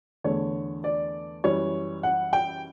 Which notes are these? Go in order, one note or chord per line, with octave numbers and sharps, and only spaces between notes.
E2 D3 A3 C#5
D5
F#2 E3 G3 C#5
F#5
G5